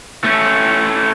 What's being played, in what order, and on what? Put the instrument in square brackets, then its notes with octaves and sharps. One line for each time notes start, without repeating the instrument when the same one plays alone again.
[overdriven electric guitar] A3 C#4